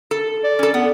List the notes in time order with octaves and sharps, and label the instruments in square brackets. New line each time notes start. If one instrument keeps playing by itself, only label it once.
[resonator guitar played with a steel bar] A4
[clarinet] D5
[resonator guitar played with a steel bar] C#4 A4
[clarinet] B3 [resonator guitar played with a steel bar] F#5